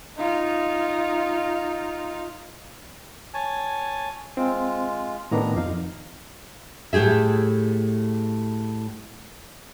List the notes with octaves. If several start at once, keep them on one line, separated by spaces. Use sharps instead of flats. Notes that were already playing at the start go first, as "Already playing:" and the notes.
D#4 F4
C#5 G#5 A5
G#3 C4 F4
A2 D#3 B3 D4 A#5
F2 D#4 F5
A2 A3 G4 G#4 E5